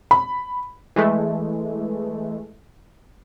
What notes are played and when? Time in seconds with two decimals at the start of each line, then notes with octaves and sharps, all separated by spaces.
0.11 B5
0.96 E3 G#3 A3